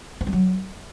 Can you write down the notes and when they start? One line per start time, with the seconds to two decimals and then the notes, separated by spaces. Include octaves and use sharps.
0.21 C4
0.27 G3
0.33 F#3